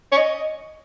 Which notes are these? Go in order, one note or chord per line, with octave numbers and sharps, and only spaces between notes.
C#5
D#5